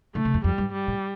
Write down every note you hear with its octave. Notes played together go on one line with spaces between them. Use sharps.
D3 A3
C3
F2
F2 G3
G2
G3
A2